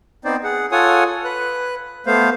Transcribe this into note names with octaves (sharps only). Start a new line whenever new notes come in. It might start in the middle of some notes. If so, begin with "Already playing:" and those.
B3 C4 D#4 C5 D5
G#4 F#5
F4 A4 C#5 F#5 G#5 D#6
B4 F#6
A3 B3 C5 F5